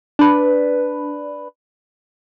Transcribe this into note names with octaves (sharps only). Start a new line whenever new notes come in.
D4 B4